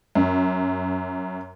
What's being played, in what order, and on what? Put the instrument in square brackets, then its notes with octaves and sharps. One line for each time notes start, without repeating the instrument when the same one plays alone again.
[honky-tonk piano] F#2